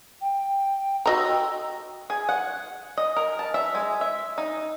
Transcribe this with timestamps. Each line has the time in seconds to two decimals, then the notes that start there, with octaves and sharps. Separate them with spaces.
0.21 G5
1.06 F#4 D#5 A#5 E6
1.27 G5
2.10 G#4
2.29 F#5
2.97 D#5
3.16 A#4
3.39 A5
3.54 E5
3.75 G#3
4.01 E5
4.38 D#4